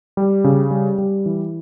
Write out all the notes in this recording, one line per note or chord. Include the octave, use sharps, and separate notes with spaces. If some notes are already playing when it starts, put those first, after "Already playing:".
G3
C#3
G3
G3
E3